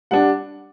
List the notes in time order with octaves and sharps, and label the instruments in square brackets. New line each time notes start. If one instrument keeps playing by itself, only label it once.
[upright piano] G3 D4 F#5